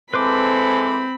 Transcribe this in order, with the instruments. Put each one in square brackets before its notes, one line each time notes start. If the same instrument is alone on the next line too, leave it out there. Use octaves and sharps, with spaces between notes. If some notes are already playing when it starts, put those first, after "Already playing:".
[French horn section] E3 G#3 A4 [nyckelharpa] C4 [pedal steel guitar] B4 C5 D6 [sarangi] B5